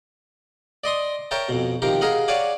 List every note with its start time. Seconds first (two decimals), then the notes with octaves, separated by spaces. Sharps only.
0.84 D5 D#5 C6 D#6
1.31 A#4 C#5 E5 G5 A5
1.49 F2 B2
1.82 C3 D#3 F3 G4 A#4
2.01 G#4 A#4 D#5 F5 F#5
2.28 C#5 D5 F5 F#5 G#5 D6